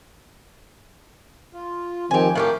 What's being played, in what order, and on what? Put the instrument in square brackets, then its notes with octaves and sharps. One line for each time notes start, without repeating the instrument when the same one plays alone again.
[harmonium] F4
[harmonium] D#3 F3 C4 [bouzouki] G4 G#5
[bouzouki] A2 F4 G4 [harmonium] A#4 F5